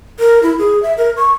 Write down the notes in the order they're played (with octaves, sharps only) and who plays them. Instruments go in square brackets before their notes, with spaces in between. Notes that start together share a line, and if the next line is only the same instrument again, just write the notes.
[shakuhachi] A#4
E4
G#4
E5
A#4
C#6